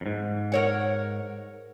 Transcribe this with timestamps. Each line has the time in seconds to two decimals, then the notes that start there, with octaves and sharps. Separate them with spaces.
0.01 F2 G#2
0.52 A#4 C#5 F#5